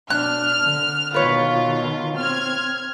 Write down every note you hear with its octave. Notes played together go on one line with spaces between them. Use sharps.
B2 D4 F6 F#6
D3
B2 D#3 F4 B4 C#5
C4 F6 G#6